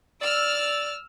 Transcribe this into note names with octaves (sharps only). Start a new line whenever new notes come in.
D5 E6 F6